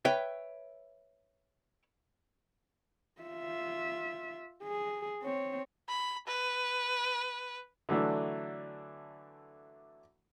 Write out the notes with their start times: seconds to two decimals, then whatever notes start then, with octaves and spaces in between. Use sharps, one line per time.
0.05 B4 C#5 E5 G5
3.22 F4 E5
4.64 G#4
5.23 C4 C#5
5.89 B5
6.27 B4
7.89 D3 E3 F#3 A3 D4